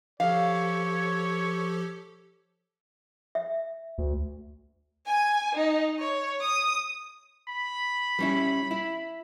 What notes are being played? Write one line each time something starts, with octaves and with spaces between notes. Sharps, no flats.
F3 G4 A4 C#5 F5
E5
D2
G#5
D#4
C#5
D#6
B5
G3 C#4 E4
E4